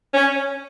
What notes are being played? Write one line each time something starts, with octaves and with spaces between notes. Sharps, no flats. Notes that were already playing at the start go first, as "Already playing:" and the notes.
C#4